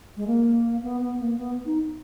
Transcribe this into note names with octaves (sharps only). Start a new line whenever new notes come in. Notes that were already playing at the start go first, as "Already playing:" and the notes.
G#3
A#3
B3
B3
A#3
B3
D#4